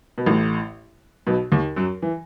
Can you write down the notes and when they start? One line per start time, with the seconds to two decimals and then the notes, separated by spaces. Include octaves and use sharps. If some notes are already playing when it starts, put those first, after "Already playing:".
0.18 B2
0.26 A1 A2
1.27 B1 B2
1.52 D#2 D#3
1.76 F#2 F#3
2.02 E3